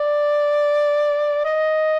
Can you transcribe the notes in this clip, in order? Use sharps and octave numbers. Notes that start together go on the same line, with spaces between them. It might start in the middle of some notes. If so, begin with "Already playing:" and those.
Already playing: D5
D#5